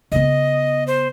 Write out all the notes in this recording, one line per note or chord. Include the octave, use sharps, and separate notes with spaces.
C#3 B3 D#5
C5